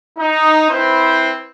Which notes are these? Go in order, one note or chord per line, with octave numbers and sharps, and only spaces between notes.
D#4
C4 E4 B4 C5